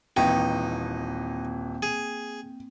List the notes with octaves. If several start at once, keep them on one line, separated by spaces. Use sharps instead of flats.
D#1 E3 A#3 C4 D#4 G5
G#4